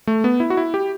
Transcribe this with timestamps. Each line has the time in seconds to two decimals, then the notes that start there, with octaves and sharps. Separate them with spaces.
0.07 A3
0.24 B3
0.40 E4
0.50 F#4
0.57 E4
0.74 G4